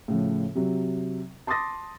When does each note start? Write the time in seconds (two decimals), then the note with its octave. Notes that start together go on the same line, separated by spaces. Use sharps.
0.08 A2 C#3 F3
0.55 C3 F#3
1.47 A5 C6 D6 D#6 A6 A#6